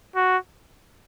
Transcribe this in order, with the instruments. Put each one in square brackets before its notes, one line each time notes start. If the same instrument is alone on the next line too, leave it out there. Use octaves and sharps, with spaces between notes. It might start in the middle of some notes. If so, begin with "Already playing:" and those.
[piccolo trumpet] F#4